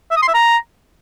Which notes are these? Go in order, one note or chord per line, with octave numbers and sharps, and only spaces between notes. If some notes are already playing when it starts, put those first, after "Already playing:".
E5
D#6
C6
E5
A#5